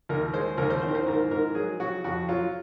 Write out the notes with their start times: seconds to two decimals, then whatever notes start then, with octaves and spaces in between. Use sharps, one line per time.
0.09 D#2 A#4
0.34 G#3 C5
0.58 D#2 A#4
0.70 C5
0.82 D#3 C5
0.88 A#4
0.95 C5
1.07 G#2 A#4
1.31 G#2 A#4
1.55 F#3 G#4
1.80 F#3 F#4
2.04 F2 F#4
2.29 F#3 F4